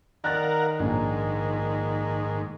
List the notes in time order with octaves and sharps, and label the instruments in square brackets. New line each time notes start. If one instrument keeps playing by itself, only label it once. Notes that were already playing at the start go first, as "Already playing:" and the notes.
[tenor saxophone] D#3 [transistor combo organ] A#4 F5 F#5 [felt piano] D5 F#6 A6
[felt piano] A#1 D4 A#5 [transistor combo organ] G#2